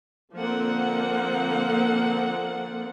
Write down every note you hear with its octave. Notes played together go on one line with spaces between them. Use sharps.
D3 F3 A#3 C4 F#5